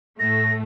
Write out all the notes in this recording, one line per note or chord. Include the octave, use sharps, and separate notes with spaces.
A2 A3 A#6